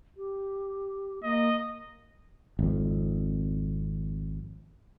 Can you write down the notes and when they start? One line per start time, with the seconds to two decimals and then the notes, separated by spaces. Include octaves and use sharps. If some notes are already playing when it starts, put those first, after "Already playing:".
0.17 G4
1.23 A#3 D#5
2.59 G#1 F2